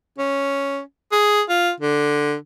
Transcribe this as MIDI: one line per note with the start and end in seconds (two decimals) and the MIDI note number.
0.19 0.80 61
1.12 1.42 68
1.49 1.71 65
1.81 2.34 50